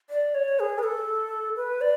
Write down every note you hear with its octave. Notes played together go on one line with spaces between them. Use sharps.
D5
C#5
G#4
B4
A4
B4
D5